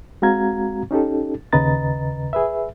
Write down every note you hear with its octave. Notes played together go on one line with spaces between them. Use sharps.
G#3 C4 F#4 F5 A#5 G#6
C#4 D#4 G4 A4
D#2 C#3 B4 D#5 A#5 A6
G#4 B4 E5